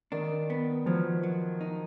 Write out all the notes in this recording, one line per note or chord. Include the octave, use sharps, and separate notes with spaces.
D#3 D4
B3
F3 F#3
F#3
D#4